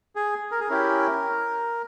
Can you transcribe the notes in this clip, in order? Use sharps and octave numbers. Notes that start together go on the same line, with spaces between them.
G#4
A#4
G#4
C#4 E4 G4 A#4